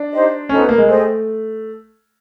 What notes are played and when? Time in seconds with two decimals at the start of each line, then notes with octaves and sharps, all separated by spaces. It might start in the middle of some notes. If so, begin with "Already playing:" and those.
Already playing: D4
0.11 D#4 G4 C5 D#5
0.49 C#4 D#4 F#4 A4 C5
0.58 B3
0.69 A#3
0.78 G#3
0.88 A3 G#4 C5 D#5 G5